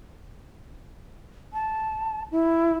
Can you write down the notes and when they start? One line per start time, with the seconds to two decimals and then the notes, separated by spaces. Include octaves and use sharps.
1.53 A5
2.31 E4